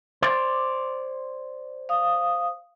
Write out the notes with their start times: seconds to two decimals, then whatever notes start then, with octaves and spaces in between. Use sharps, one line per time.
0.22 C5 D5
1.89 F5 D#6